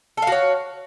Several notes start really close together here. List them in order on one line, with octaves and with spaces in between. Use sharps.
A4 F5 F#4 C#5